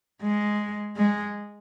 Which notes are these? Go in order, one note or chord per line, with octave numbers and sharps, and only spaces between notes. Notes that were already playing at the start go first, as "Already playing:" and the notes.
G#3
G#3